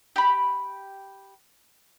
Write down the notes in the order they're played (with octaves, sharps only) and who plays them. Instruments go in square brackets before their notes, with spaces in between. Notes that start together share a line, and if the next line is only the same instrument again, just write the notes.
[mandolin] G4 B5